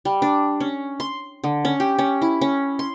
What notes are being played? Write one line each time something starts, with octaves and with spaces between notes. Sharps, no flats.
G3
D4
C#4
C6
D3
C#4
G4
C#4
E4
C#4
C6